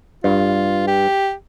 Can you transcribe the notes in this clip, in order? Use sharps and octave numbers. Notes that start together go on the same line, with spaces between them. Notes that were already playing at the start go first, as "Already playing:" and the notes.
G2 F4
G4